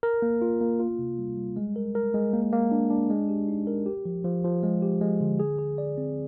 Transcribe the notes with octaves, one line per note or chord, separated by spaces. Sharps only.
A#4
A#3
F4
A#3
F4
C3
G3
G3
G#3
A#4
A#4
G#3
A#3
A#3
D4
D4
G#3
G4
D#4
A#4
G4
F3
F3
F3
G#3
G4
G#3
D3
G#4
G#4
D5
C4